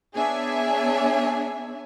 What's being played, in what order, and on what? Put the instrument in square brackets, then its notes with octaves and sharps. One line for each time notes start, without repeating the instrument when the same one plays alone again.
[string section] B3 D4 G#4 C#5 E5 G#5